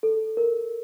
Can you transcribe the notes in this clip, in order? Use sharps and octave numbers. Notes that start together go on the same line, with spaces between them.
A4
A#4